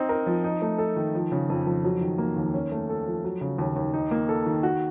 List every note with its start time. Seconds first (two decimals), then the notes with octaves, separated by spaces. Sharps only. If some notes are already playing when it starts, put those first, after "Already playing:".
Already playing: C4 D#4
0.09 A#4
0.26 F3
0.44 D#4
0.62 A3
0.78 A4
0.96 D#3
1.15 F3
1.32 C#3
1.50 F2
1.67 F2
1.85 F#3
2.01 D#3
2.18 A#3
2.36 D#2
2.54 C#4
2.72 A3
2.89 A4
3.07 F3
3.24 F#3
3.41 C#3
3.58 D#2
3.76 D#2
3.93 D#4
4.11 A#3
4.29 A4
4.46 D#3
4.63 F#4